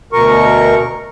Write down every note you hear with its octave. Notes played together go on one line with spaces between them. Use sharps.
D2 B2 A#4 C#6